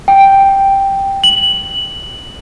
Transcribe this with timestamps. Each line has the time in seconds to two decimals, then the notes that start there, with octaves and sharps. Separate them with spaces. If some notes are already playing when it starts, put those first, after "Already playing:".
0.08 G5
1.24 F#7